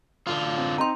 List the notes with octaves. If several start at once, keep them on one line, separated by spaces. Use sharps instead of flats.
D3 F4
C4
C4 D#4 G5 A#5 C6